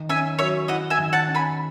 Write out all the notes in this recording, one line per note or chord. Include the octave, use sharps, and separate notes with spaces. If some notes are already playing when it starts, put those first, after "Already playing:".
Already playing: D#3
C#4 E5 G#5
F#3 C#5 E5
E4 D#5 F#5
E5 G#5
D#3
F#5 A5
C#4
G#5 B5